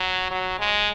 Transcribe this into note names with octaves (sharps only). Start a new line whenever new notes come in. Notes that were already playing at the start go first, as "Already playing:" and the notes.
Already playing: F#3
F#3
G#3